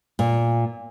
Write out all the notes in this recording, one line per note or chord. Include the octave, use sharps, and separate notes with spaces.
A#2